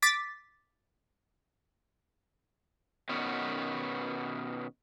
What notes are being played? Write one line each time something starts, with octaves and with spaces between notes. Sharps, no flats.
D6 A6 B6
B2 D#3 B3 C#4